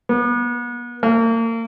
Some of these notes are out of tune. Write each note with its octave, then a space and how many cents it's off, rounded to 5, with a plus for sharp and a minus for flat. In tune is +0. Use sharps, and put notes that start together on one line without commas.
B3 -40
A#3 -35